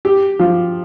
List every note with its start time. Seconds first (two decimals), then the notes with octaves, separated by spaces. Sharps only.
0.05 G4
0.39 F3